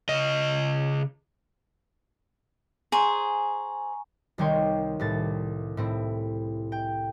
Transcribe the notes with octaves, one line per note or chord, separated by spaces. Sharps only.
C#3 D#5
G#4 C5 G#5 A#5 C#6
C2 D#3 G3 C#5 G5 C6
C2 A2 A6
A2 C4 E4
G5